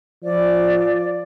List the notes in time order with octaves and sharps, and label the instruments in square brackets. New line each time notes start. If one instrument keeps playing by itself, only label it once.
[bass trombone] F3 [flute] D5